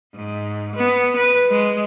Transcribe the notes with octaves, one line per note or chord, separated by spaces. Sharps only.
G#2
B3
B4
G#3